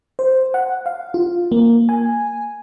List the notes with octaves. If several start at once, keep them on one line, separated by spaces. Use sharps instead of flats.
C5
F#5
F5
F4
A#3
G#5